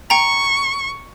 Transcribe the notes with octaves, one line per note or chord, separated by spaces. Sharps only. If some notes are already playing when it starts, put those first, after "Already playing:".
G5 A#5 C#6